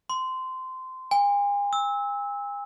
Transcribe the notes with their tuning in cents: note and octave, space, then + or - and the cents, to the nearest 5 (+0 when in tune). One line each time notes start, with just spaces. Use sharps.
C6 -20
G#5 -40
E6 -20